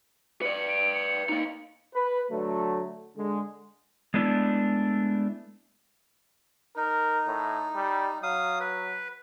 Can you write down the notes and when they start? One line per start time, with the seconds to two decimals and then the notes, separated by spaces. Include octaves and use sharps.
0.42 B4 D5 C#7
0.68 D7
0.94 C#7
1.29 A#3 D#4
1.94 B4
2.30 D3 F#3 A3
3.16 D3 G#3
4.14 G#3 A3 B3 D4 E4
6.76 D#4 A#4
7.27 A2
7.75 G3
8.23 F#3 F5 D#6
8.60 B4